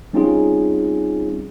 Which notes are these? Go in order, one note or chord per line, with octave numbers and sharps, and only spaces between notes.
G3 C4 C#4 D#4 F4 G#4